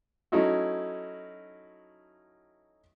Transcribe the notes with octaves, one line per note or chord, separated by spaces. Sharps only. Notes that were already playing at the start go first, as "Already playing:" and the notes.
F#3 A3 C#4 D#4 E4 F#4